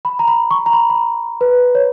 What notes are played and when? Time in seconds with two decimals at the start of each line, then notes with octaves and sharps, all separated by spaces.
0.05 B5
0.19 A#5
0.28 B5
0.51 C#6
0.66 A#5
0.73 B5
0.90 B5
0.95 A#5
1.41 B4
1.75 C#5